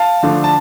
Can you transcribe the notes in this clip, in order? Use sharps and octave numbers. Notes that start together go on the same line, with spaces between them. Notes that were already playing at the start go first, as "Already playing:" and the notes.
Already playing: F5 A5
D3 F3 A3 D4
A5